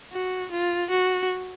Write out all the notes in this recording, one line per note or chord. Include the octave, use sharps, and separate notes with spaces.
F#4
F4
F#4